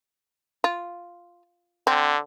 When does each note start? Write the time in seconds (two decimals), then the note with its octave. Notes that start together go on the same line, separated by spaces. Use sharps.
0.64 F4
1.87 D3 C4